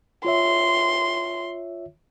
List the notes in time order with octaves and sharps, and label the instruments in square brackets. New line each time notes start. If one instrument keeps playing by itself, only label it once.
[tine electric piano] F4 C#5 E5 [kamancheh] C6